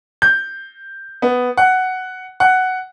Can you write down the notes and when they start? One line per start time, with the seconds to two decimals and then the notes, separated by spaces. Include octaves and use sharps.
0.22 G6
1.22 B3
1.57 F#5
2.40 F#5